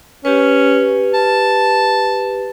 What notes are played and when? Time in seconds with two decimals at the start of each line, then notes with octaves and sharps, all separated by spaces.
0.25 C#4 G4 B4
1.14 A5